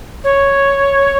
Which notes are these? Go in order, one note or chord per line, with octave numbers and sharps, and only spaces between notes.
C#5